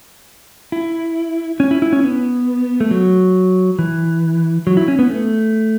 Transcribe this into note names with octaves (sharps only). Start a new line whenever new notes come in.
E4
C#4
E4
E4
C#4
B3
A3
F#3
E3
F#3
E4
C#4
B3
A3